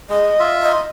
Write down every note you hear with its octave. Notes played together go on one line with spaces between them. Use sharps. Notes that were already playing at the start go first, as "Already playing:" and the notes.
G#3 D#5
F4 E5
D#5